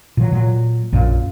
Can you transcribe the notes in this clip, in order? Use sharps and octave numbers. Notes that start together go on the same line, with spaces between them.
A#2 E3 F#3
A#2 F#3
A#1 F#2 A#2